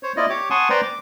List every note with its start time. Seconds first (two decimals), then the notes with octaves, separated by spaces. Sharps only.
0.03 C5 C#5
0.17 A#3 E4 F4 D5 D#5
0.30 G4 C#5 D6
0.50 F#5 G#5 A5 C6 C#6 D#6
0.70 B4 C5 D5 G5 A#5 C6
0.83 D6